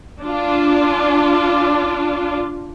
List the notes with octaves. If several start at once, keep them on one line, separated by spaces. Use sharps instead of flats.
D4 F4